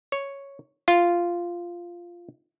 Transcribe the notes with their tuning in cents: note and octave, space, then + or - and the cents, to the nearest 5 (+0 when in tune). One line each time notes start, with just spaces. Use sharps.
C#5 +0
F4 -5